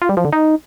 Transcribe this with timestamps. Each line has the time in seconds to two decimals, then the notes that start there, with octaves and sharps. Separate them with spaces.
0.02 F4
0.09 G3
0.17 F3
0.25 D3
0.33 D#4